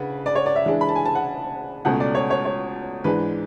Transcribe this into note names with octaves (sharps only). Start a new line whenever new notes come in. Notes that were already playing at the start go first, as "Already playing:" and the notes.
Already playing: C#3 D4 B4 F#5
D5
C#5
D5
E5
C#3 E3 G#3 D4
B5
A5
G#5
A5
F#5
C#2 B2 A3 C#4 F#5
D5
C#5
C#5
C#5
G#2 E3 G#3 D4 B4